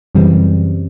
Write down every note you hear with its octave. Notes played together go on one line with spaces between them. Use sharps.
F#2 C#3 E3 G3 C4